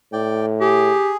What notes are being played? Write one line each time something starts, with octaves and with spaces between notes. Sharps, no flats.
A2 D5 G5
G4 G#4